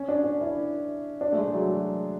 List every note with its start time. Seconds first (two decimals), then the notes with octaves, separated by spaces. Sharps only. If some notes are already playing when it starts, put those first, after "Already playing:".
Already playing: C#4
0.08 D4
0.24 D4
0.41 E4
1.21 D4
1.33 A3
1.38 G#3
1.54 F#3